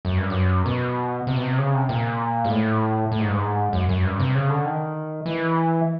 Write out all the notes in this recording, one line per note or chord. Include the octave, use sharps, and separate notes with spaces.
F#2
G2
F#2
B2
C3
B2
C3
C#3
C3
A#2
G#2
A2
A2
G#2
G2
G#2
F#2
F#2
G2
C3
C#3
D3
D#3
E3